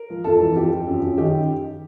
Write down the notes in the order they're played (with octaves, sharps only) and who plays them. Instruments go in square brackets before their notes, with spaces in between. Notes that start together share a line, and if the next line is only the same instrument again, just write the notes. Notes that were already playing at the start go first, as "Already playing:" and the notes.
Already playing: [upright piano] A#4
F3
F2 A4
E3
F2 G4
F2
F#2
F#2
D#3 G4